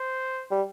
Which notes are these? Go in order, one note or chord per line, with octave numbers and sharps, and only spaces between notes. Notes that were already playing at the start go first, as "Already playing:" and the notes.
Already playing: C5
G3